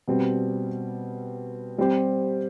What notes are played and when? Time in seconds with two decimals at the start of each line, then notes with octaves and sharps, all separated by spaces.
0.08 B2 G3 C4
1.78 G3 C4 G4 C5